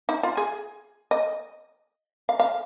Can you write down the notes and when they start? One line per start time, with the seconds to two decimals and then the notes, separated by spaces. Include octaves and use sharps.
0.09 D#4
0.23 F4
0.37 G#4
1.11 D#5
2.29 F5
2.40 F5